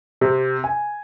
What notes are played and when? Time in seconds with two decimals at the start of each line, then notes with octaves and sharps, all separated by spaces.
0.21 C3
0.64 G#5